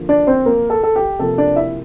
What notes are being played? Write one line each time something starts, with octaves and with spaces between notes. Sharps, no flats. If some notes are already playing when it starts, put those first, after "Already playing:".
Already playing: D3 F3 A#3
D4 D5
C4 C5
A#3 A#4
A4
A4
G4
C3 F3 A#3 A4
D4 D5
E4 E5